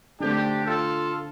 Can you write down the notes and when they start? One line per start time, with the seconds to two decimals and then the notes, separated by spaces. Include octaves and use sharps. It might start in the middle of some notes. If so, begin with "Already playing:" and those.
0.20 D3 A3 C4 D4 G4
0.65 F4 A4